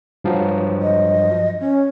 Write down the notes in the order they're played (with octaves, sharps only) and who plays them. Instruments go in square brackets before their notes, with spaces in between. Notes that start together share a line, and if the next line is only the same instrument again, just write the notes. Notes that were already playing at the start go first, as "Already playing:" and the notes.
[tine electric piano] G2 F3 F#3
[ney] D#5
C#4